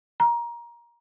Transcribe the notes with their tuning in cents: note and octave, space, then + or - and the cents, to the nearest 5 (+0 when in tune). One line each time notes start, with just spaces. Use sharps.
A#5 +20